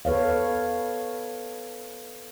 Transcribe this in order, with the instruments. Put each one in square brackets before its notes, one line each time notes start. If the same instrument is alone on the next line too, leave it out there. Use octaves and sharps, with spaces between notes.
[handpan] A4 B4 C#5 F5